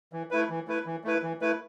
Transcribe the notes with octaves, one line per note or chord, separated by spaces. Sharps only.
E3
A3 E4 B4
E3
A3 E4 B4
E3
A3 E4 B4
E3
A3 E4 B4